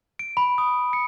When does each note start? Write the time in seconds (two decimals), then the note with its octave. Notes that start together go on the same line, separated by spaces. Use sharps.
0.19 D7
0.37 B5
0.58 D#6
0.93 C#7